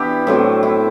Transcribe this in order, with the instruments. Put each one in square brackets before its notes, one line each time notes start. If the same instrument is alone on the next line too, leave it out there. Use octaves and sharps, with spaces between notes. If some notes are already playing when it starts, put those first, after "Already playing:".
Already playing: [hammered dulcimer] E3 B3 D4 E4 G4
A2 F#3 C4
E4